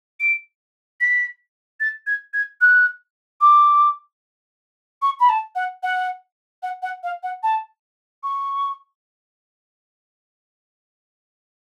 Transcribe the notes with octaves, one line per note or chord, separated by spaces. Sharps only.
D7
B6
A6
G#6
G#6
F#6
D6
C#6
B5
A5
F#5
F#5
F#5
F#5
F5
F#5
A5
C#6